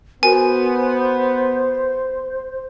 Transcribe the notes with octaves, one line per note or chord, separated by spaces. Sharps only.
B3 F#4 A#4 C5 G#5